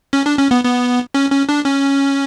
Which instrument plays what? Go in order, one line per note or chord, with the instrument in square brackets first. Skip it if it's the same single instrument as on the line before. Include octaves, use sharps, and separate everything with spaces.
[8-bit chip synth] C#4
D4
C#4
B3
B3
C#4
C#4
D4
C#4